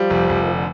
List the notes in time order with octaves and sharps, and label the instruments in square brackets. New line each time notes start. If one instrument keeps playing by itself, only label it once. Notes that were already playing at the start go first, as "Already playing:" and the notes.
Already playing: [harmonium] F3 [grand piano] G3
[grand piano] F1
F1
[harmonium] D#3
D3